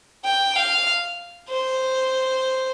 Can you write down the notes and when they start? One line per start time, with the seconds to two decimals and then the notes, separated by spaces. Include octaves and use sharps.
0.25 G5
0.56 F5
1.50 C5